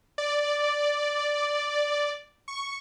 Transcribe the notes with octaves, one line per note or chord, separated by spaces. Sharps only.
D5
C#6